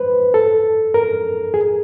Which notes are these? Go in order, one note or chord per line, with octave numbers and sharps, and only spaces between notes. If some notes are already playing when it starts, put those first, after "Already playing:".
Already playing: B4 C5
A4
A#4
G#4